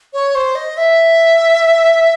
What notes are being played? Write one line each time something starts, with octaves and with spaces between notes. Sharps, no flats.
C#5
C5
D#5
E5